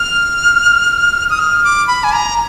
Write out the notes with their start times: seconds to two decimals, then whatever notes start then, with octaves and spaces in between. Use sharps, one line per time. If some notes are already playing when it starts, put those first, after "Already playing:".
Already playing: F6
1.29 D#6
1.39 F6
1.64 D6
1.87 B5
2.04 G#5
2.13 A#5